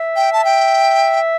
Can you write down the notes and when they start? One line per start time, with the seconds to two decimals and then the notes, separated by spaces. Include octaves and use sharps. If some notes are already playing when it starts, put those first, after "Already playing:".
Already playing: E5
0.16 G5
0.33 A5
0.45 G5